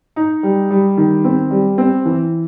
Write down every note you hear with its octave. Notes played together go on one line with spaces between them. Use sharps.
D#4
G3
G3
D#3
C4
G3
C4
E3